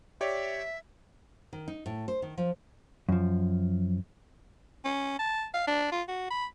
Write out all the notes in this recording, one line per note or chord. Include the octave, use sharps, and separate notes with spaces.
G4 C#5 D5 E5
D#3
D#4
A2
C5
D#3
F3
F#2 F3
C#4
A5
F5
D4
F4
F#4
B5